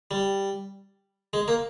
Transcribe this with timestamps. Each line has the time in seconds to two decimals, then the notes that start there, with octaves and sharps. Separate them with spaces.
0.11 G3
1.33 G#3
1.48 A#3